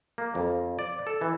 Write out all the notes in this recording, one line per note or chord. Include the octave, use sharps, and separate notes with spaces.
A#3
F2
D5
A4
E3